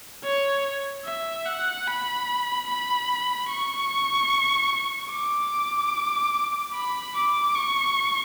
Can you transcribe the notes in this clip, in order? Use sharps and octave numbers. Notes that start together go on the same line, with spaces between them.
C#5
E5
F#5
B5
B5
C#6
D6
B5
D6
C#6